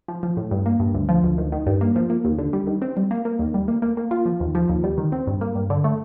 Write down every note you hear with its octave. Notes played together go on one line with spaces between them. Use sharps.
F3
F3
A2
G2
A#3
G2
D2
F3
D2
D#3
D#3
G2
A#3
F3
A#3
D#2
D3
G3
D#3
C4
G3
A#3
A#3
D#2
G3
A#3
A#3
A#3
F4
F3
D#2
F3
D#2
G3
D#3
C4
G2
A#3
G2
D3
A3